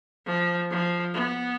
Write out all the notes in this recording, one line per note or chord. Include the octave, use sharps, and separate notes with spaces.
F3
F3
B3